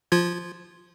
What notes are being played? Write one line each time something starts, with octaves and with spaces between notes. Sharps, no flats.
F3 F4 G#6